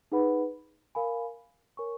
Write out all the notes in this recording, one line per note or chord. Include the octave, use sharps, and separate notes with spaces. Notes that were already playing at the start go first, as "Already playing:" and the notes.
D#4 G#4 B4 F#5 B5
A#4 F5 G#5 B5
A#4 C#5 G#5 C#6